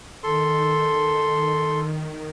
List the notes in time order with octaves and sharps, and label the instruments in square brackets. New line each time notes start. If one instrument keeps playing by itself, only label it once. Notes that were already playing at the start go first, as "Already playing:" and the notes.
[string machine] D#3 [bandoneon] A4 C6